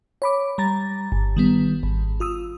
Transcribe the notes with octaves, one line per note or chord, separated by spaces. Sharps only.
C#5 B5 D6
G3 A#5 A6
G1
D#3 G3 B3
G#1
F4 D#6 E6